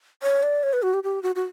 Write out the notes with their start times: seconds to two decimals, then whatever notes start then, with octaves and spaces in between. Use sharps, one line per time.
0.23 C#5
0.43 D5
0.63 C#5
0.73 B4
0.83 F#4
0.94 G4
1.04 G4
1.23 F#4
1.35 F#4